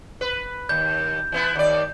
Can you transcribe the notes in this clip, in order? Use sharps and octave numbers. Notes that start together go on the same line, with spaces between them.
B4
D#2 G6
E3 B3 E4
D#2 D5